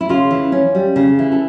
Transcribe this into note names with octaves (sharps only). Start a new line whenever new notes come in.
E4
C#3 F4
E3
C#4
G3
C#3
E3
A4